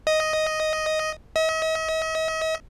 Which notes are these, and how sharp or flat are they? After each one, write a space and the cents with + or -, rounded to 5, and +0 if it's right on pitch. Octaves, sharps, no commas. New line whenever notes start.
D#5 +5
D#5 +45